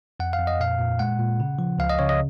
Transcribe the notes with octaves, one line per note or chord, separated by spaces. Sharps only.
F2 F#5
F5
F2
D#5
A#2 F5
A#2
G#3 F#5
A#2
C#3
F3
C#2 F5
D#5
C#3 C#5
D#5